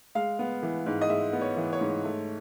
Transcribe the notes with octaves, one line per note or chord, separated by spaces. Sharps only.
G#3 F5
B3
E3
G#2
D#5
G#3 E5
B3
C#5
E3
C#5
G#2
A3